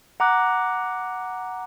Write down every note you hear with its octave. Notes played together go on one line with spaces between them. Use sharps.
F#5 A#5 D6 F#6